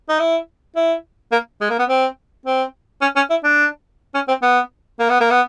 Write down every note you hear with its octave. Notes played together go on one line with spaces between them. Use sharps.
D#4
E4
E4
A#3
G#3
A#3
B3
C4
C4
C#4
C#4
E4
D4
C#4
C4
B3
A#3
B3
A#3
B3